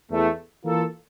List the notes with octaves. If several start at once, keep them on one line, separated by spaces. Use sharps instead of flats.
E2 E3 A3
E3 A#3 F4 A4